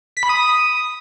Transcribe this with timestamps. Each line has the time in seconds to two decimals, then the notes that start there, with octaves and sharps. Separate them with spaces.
0.17 B6
0.23 B5
0.29 D#6